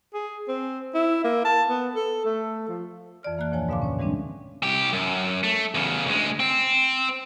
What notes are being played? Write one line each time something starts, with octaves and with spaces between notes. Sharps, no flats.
G#4
C4
E4
A#3
A5
B3
A4
A3
F3
F2 E3 D5 F6
F2 E3 A#3 A5 F#6
D2 A#2 F3 C#5 G#5 A5
G#2 B2 D3 F5 C6 D6
C#4 C#5
E3 G3 G#3 C4 D4
C2 G4
F#2
A3
E2 C#3
D2 G#3
C4